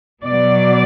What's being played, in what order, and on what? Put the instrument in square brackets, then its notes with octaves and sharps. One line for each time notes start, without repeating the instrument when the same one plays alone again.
[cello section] B2 F#3 D5